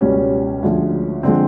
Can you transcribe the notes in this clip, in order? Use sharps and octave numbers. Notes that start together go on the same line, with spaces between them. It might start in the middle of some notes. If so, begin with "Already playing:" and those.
C#2 B2 G3 C#4
D2 D3 F3 G#3
D3 F3 G#3 C4